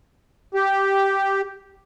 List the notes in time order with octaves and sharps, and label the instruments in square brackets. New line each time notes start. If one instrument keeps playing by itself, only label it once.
[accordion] G4